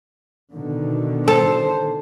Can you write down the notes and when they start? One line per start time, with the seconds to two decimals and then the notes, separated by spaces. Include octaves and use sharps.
0.54 B2 D3 D#3
1.28 A4 C5